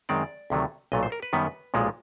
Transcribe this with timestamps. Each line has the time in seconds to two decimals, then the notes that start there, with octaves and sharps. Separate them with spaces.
0.09 F#2 D#3 G#3 C4 D5
0.50 D2 C3 D#3 F#3 A3
0.92 B1 A#2 F#3 A3 D#5
1.03 C5
1.12 A#4
1.22 B4
1.33 F#2 D#3 G3 B3
1.74 B1 A#2 F3 G#3